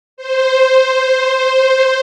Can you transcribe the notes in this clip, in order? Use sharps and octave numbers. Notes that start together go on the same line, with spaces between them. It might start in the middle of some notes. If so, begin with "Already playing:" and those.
C5